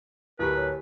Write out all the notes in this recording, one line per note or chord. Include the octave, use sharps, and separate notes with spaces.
D1 E4 G4 A#4 B4 B5
C#5